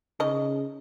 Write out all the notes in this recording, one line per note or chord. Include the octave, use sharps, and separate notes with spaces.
C#3 C#4 D#4 D#5